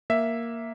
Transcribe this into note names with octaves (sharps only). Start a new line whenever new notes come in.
A#3 E5